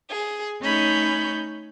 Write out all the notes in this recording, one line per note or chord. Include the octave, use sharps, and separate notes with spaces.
G#4
A3 C#4 D#4 C#5 B5 G6